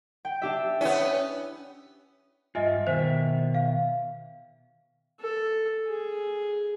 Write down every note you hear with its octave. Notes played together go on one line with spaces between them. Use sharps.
G5
D4 G4 E5
B3 C#4 E4
G2 F4 D#5 E5 G#5
B2 D#3 C5 E5
F5
A4
G#4